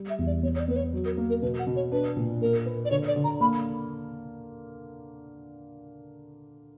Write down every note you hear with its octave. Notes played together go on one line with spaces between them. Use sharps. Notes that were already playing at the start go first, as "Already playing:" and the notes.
Already playing: G3
E5
E2
D5
B3 C#5
C#5
D5
B3 B4
C#5
F#3
A#4
A#3
A#4
B2 B4
F#5
B2
C#5
D4 B4
A#2
A#3 A#4
B4
D5
D3 C#5
D5
D3
A#5
A#3 B5